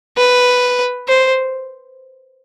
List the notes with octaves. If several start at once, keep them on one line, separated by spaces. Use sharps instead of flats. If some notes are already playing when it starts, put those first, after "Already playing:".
B4
C5